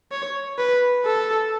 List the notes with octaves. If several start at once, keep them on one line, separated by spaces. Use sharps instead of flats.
C#5
B4
A4